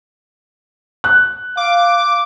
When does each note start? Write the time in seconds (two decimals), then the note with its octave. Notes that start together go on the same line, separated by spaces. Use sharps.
1.04 F#6
1.57 F5 D6